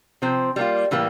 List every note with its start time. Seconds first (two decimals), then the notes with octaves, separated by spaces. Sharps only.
0.22 C3 F3 C4
0.56 G3 A#3 F4
0.91 A2 E3 G3 A#3